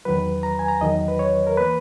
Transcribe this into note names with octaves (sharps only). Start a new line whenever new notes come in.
E2 D#3 F#3 B4
A#5
G#5
A#5
E2 D#3 F#3 D#5
B4
C#5
A#4
E3 A#3 B4